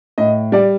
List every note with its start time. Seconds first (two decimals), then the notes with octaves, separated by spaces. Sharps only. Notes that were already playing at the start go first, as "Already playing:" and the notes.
0.18 A2 D#5
0.52 G3 D5